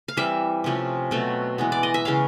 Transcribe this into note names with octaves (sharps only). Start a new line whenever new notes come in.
F5
E3 G3 C4 E5
C3 F3 A3 C#4
B2 F#3 A3 C4
E3 G#3 B3
D5
D#5
E5
C#3 E3 G#3 C#4 F5